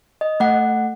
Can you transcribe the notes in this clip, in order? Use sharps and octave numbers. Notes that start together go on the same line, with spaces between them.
D#5
A3 F#5